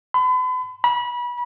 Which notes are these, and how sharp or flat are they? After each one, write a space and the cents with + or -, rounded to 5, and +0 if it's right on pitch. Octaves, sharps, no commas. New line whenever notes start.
B5 +40
B5 -30